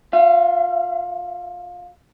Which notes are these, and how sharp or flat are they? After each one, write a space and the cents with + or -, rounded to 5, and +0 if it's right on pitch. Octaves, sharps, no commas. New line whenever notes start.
F4 +25 F5 -40